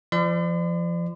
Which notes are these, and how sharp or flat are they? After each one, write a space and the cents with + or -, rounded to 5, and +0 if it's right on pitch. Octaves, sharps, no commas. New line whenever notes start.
F3 -30 D5 +30 C6 -45